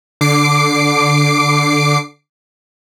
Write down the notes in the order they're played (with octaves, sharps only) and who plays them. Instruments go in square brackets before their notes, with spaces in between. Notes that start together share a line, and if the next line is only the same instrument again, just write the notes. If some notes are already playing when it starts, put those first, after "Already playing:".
[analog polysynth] D3 D6 C7 D7